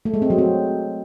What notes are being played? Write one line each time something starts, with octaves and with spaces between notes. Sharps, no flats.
A3
G#3
C4
F#3
C4